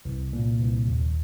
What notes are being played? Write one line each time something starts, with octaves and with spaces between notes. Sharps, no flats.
C2
A#2
C2
D#2